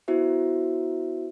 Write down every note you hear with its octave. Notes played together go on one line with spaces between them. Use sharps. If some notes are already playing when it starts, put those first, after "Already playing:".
B3 E4 F#4 C5 E5